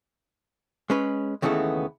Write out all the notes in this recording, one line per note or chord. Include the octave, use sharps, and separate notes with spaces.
G#3 C#4 B4
D#2 C#3 E3 A3 B3 A4